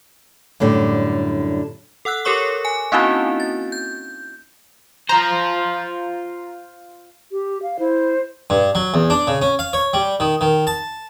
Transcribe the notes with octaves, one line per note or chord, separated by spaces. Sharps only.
F#2 A2 D3 G3
A4 F#5 E6 F#6
G4 A4 A#4 C#5 C#6 D6
G#5
A#3 C4 C#4 D#4 E4 F#4
A6
G6
F4 C5 A#5
G4
F5
E4 C5
G2
F#3
E2
D4
C#3
C#4
F5
C#5
G3
D#3
D#3
A5